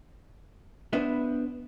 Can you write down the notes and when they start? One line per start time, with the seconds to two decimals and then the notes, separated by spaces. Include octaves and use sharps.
0.93 B3 D4 B4 C5 E5